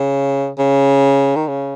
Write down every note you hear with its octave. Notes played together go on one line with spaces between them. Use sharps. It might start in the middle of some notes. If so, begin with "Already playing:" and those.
Already playing: C#3
C#3
D#3
C#3